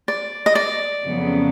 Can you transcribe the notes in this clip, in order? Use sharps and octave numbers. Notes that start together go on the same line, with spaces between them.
D5
D#5
D5
F2 C#3 F#3 B3